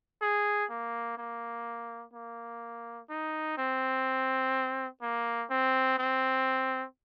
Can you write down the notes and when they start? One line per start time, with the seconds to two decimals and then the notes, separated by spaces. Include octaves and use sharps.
0.22 G#4
0.70 A#3
1.18 A#3
2.14 A#3
3.10 D#4
3.58 C4
5.02 A#3
5.50 C4
5.98 C4